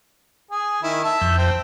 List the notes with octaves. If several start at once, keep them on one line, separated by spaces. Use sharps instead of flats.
G#4
D#3 E4
E5 A5
F2 G6
C4